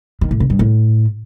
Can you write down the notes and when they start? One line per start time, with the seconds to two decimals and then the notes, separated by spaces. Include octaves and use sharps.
0.21 D#3
0.31 A2
0.40 C#3
0.50 G2
0.59 A2